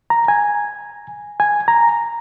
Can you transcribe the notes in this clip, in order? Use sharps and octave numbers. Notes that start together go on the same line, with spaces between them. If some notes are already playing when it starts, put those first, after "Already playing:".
A#5
G#5
G#5
A#5